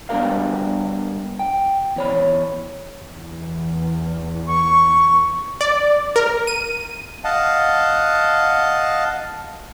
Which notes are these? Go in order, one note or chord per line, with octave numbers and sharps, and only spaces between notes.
G3 B3 D4 G4 A#4 F5
G5
E2 C#5 B5
E2
C#6
D5
A#4
D#7
D#5 F5 F#5 A5